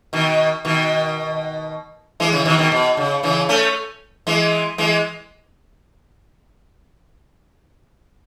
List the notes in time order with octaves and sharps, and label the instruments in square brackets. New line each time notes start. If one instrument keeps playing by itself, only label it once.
[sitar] B2 D#3
B2 D#3
E3 G#3
C#3 E3
B2 D#3
B2 D#3
B2
C#3
C#3 E3
A3 C#4
E3 G#3
E3 G#3